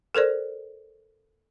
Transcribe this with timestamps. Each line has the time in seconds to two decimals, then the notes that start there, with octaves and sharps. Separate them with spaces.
0.15 A4 A#4 C5 D5